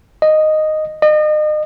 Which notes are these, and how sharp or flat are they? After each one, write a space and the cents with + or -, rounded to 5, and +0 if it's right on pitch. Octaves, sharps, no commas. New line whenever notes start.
D#5 -5
D#5 -35